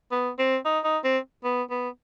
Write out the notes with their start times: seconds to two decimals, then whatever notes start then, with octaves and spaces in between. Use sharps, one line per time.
0.11 B3
0.39 C4
0.65 D#4
0.84 D#4
1.04 C4
1.44 B3
1.70 B3